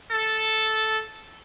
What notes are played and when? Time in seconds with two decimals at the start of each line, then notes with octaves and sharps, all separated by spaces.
0.12 A4